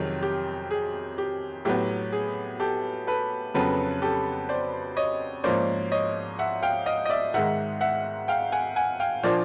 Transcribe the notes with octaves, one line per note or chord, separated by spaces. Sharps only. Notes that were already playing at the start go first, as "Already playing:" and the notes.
Already playing: F2 C3 D#3 F#3 G#4
G4
G#4
G4
A2 F#3 B3 G4
G#4
G4 A4
A4 B4
F2 C#3 F#3 B3 A4 B4
G4 A4
C5 D5
C#5 D#5
G#2 F3 A#3 C#4 C5 D5
C#5 D#5
E5 F#5
F5 G5
D#5 F5
D#5
D5 E5
G#2 D#3 G#3 E5 F#5
E5 F#5
F5 G5
F#5 G#5
F#5 G#5
F5 G5
A#2 F3 A#3 D4 F4 C5 D5